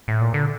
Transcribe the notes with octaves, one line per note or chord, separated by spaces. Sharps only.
A2
A#2
D3